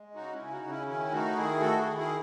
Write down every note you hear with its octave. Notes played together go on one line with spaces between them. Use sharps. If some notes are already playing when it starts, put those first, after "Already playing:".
Already playing: G#3
C#3 D#4 F#4
C#4 E4
C#3
D#4 F#4
C#3
C#4 E4
D#3 C#4 E4
A3 D#4 F#4
D#3 E4 G#4
A3 F#4 A4
E4 G#4
D#3
E4 G#4